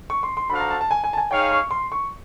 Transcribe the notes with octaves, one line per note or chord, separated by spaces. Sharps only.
C#6
C6
C6
D4 F#4 A4 C5 F5 B5
A#5
A5
A5
G#5
G#5
A5
G#5
D#4 G#4 C#5 F5 G5
C#6
C6
C#6